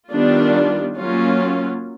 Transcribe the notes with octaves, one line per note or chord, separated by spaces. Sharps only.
D#3 G3 B3 D4 F4
F#3 A#3 C#4 F4